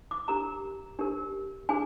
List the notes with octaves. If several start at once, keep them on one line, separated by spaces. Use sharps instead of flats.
D6
D4 G4 A#4 A#5
D4 G4 A#4
D4 G#4 G#5